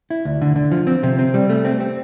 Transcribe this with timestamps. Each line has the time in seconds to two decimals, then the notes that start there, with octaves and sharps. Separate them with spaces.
0.10 E4
0.25 D2
0.41 D3
0.56 D3
0.72 F3
0.87 C4
1.03 C3
1.19 C4
1.34 G3
1.49 A3
1.65 C4
1.80 C4